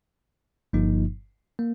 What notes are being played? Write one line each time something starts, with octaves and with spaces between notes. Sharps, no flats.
G1 G2 F3 A#3 D#4
A#3